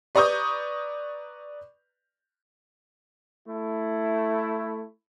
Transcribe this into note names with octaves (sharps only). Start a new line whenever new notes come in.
B4 D5 A#5 C#6 D#6 G6
A3 E4